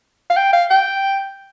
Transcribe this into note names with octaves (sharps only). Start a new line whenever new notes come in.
F5
G5
F5
G5